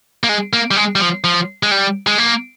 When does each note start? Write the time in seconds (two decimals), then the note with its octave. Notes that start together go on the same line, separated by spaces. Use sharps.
0.24 A#3
0.29 G#3
0.53 A#3
0.71 G3
0.76 G#3
0.96 G3
1.00 F3
1.24 F3
1.63 G#3
1.71 G3
2.07 G#3
2.18 A#3